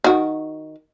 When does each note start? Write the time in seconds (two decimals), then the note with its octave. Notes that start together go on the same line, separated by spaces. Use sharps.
0.04 D#3 F#4